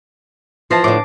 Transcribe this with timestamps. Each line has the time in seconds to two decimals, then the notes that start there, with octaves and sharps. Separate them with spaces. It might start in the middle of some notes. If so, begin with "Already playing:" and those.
0.71 E3 F3 A5 A#6 C7
0.84 A2 D3 D6